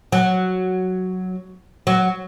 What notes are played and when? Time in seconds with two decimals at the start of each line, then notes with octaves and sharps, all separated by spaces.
0.12 F#3
1.87 F#3